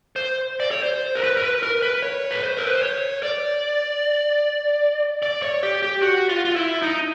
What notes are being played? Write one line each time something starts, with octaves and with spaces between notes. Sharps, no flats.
C5
D5
C#5
C5
A#4
B4
A#4
B4
A#4
B4
C#5
B4
C5
A#4
B4
C5
C#5
D5
D5
C#5
G4
G4
F#4
F4
F4
E4
D#4